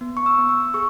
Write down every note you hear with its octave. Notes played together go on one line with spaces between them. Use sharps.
B3
C#6
E6
B3
E6
G#4 C#6